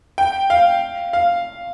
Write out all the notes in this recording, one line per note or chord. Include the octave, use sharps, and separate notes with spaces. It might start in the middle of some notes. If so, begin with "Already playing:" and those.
G5
F5
F5